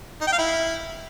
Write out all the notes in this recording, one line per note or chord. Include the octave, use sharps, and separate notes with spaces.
D#4
G5
F5
E4